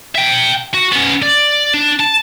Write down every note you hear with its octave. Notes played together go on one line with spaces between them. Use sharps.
E5 G5
F#4
B3 C#4
D5
D4
A5